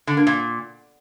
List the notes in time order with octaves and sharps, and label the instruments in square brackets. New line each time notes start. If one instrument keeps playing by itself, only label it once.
[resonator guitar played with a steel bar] D3
A#3
A#2